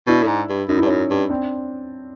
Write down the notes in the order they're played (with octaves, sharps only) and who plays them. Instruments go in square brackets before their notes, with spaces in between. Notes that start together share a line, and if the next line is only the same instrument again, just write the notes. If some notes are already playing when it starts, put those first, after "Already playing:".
[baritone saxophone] B2 [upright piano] D4 E4
[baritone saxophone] A2
G#2
G2
[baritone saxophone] F#2 [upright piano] D#4
[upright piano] E4
[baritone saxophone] G2
[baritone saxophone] F#2 [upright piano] C#4 D#4
[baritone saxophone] G2
[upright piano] C4 D4